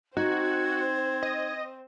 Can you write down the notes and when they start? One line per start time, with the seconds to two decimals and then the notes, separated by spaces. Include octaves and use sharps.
0.17 C4 D#4 F#4 C5 G#6
1.23 D#5